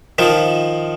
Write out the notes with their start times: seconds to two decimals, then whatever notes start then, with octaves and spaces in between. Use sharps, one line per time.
0.18 D#3 F3